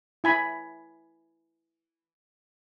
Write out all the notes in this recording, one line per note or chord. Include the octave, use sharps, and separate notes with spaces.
E4 G#5 B5